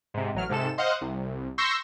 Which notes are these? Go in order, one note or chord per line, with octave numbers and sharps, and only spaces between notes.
G#2 C3
A1 F#3 F6
G#2 C3 A4 E7
C5 D#5 F5 F#5
C2
C6 C#6 E6 G6 A#6